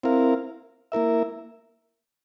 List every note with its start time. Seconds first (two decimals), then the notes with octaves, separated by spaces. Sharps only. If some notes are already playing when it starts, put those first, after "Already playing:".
0.03 C4 E4 A#4 F5
0.92 A#3 E4 A#4 E5